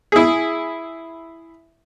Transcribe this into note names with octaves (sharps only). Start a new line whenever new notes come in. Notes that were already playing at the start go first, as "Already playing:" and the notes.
E4 G#4